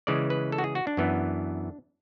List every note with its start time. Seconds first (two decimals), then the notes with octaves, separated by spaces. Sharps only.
0.07 C#3 E3 G#3 D5
0.30 B4
0.52 A4
0.58 F#4
0.64 G#4
0.75 F#4
0.87 D4
0.97 F#2 E3 B3